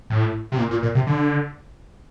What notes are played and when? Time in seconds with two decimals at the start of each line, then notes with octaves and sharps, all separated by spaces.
0.10 A2
0.52 C3
0.58 A#2
0.71 A#2
0.83 A#2
0.95 C3
1.07 D3